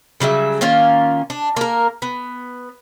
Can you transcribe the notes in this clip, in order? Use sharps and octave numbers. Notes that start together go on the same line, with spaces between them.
C#3 F#3 G3 E5
D#3 A#3 C#4 F4
D4
A#3 A#4
B3